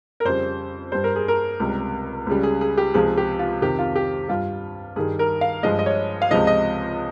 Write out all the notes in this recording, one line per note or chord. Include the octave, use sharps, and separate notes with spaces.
A#4
F2 C#3 G3 C5
G2 G3 C5
A#4
G#4
A#4
C#2 C3 G3
C#2 C#3 G3
G#4
G#4
G4
C#2 C3 F3 G#3 G#4
G4
F4
F2 C3 D#3 G4
F4
G4
G2 G3 F4
G2 D#3 G3 G#4
A#4
F5
G2 F3 G#3 D#5
D#5
C#5
F5
C#2 C3 F3 G#3 D#5
D#5